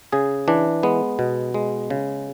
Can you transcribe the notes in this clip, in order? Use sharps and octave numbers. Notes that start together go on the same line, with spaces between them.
C#3 G#4
E3 D4
G#3 B3
B2
G#3
C#3